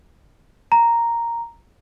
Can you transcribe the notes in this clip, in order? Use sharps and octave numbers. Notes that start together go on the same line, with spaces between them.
A#5